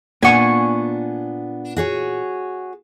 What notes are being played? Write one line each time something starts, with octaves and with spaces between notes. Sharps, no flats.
A#2 B3 D4 F#5 G#5 C#6
F#4 G#4 C#5